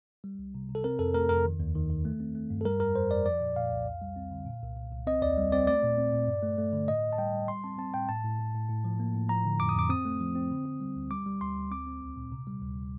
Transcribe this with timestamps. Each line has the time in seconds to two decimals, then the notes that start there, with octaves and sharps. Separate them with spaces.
0.24 G3
0.39 C2
0.55 C3
0.69 C3
0.75 A4
0.84 C4 A#4
0.99 F2 A4
1.14 A3 A#4
1.29 F2 A#4
1.45 D#3
1.60 D#2
1.75 D#3
1.90 D#3
2.05 A3
2.20 C4
2.35 A3
2.50 G2
2.61 A4
2.65 G3 A#4
2.80 F2 A#4
2.95 F2 C5
3.11 F2 D5
3.26 F3 D5
3.40 A#2
3.56 A#2 F5
3.71 C2
3.86 F2
4.01 G3
4.16 C4
4.31 D3
4.46 A#2
4.62 C2
4.77 C2
4.92 C2
5.07 C4 D#5
5.22 D#2 D5
5.37 G3
5.52 C4 D5
5.67 A3 D5
5.83 A#2
5.98 C4
6.13 A#2
6.28 G2
6.43 A3
6.58 A3
6.73 D3
6.88 A2 D#5
7.03 A2
7.13 A5
7.18 G3 G5
7.33 G3
7.48 G3 C6
7.64 C4 A5
7.78 C4 A5
7.94 A2 G5
8.09 A2 A5
8.24 A2
8.39 A2
8.54 A2
8.69 A2
8.84 F3
9.00 A#3
9.14 A2
9.29 F3 A#5
9.45 D3
9.60 F2 D6
9.69 D#6
9.75 F2 D6
9.90 C4 D#6
10.05 A3
10.20 F3
10.35 C4
10.51 D3
10.66 C4
10.80 G3
10.96 D2
11.11 G3 D6
11.26 G3
11.41 D2 C6
11.56 D2
11.71 C4 D6
11.86 C4
12.01 C2
12.16 A#2
12.32 C3
12.47 G3
12.62 D2